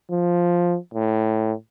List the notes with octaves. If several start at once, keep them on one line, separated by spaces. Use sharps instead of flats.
F3
A2